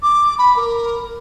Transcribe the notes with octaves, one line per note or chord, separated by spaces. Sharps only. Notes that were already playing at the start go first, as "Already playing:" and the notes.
D6
B5
A#4